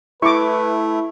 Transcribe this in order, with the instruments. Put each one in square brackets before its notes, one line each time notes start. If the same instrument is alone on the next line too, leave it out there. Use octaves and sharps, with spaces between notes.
[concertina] A3 [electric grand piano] E4 [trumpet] B4 [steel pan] C#6 D6